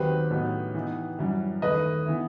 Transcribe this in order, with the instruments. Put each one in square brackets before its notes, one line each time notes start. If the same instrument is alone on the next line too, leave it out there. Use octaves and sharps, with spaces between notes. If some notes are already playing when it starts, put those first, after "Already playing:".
Already playing: [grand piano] D#2 D#3 F#3 C4 [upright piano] G4 B4
[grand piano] A2 F#3 B3 D#4
E3 B3 D#4
F#2 E3 G3
[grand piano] D#2 D#3 A3 E4 [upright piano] B4 D#5
[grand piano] E3 B3 E4